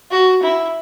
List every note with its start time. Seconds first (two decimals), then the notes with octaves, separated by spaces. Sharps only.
0.11 F#4
0.43 E4